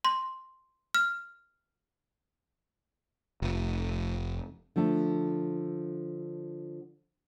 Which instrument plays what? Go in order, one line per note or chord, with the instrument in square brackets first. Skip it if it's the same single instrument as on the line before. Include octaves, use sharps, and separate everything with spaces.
[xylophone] C6
F6
[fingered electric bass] F1
[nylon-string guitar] D3 F3 A3 D4